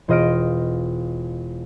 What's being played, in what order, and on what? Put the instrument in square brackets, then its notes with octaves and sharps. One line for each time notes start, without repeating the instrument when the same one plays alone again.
[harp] E1 F4 D#5 F6 D7